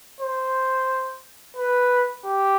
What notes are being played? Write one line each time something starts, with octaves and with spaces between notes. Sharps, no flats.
C5
B4
G4